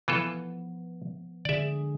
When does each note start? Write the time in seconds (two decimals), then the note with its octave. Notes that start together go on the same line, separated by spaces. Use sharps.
0.08 E3 F3 B3 F4 A4
1.45 D3 G#4 D5 E5